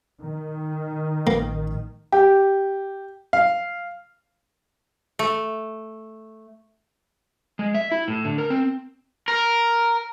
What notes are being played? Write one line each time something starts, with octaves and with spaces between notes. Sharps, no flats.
D#3
A1 A#3
G4
F5
A3
G#3
E5
E4
A2
D3
A#4
C4
A#4